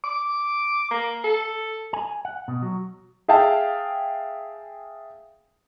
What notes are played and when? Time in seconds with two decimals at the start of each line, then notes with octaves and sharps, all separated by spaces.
0.04 D6
0.91 A#3
1.24 A4
1.93 G#5
2.25 F#5
2.48 B2
2.62 F#3
3.28 G#4 E5 F5 G5 A5